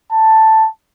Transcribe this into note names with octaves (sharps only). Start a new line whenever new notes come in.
A5